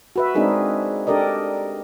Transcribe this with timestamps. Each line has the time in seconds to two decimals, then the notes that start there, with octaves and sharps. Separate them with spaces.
0.16 F#4 B4 E5
0.35 G#3 C4 D4 D#4 G#4 A#4
1.07 D4 G4 A4 A#4 D5 D#5